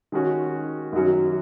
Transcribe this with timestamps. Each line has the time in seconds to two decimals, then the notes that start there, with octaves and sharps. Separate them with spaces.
0.12 D#3 G#3 C#4 F#4
0.92 F#2 D#3 F#3 C#4 F#4